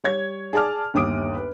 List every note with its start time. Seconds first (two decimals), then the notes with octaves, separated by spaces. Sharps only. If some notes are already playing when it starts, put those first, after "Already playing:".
0.04 G3 C#5 G#6
0.53 G#4 D5 A5 D6 F6
0.94 G1 D#2 D6 D#6 D7
1.35 B4